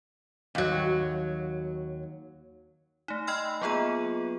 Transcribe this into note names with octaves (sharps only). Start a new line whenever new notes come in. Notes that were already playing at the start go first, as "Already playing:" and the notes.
D#2 F#3
A3 D#4
D#5 G5 B5 C6 E6 F6
F#3 A#3 B3 F4 G#4 D#7